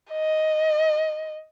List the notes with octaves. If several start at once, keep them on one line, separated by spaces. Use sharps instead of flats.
D#5